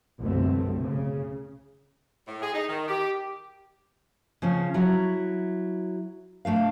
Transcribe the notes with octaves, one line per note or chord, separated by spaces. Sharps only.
C2 F#2 B2 D3 A3 C4
C#3
A2
G#4
D#4
D#3
G4
C#3 F3 C#4
F#3 E4
C3 A3 D4 F5